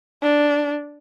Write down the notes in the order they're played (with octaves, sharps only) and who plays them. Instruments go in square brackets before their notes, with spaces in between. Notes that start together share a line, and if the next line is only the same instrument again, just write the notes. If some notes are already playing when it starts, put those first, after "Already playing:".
[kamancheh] D4